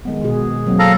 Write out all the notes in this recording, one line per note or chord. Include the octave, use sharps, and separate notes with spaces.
D#3 G#3 B3
B2 F#4 G#4
F#3 A#3 C4
A4 F5 A#5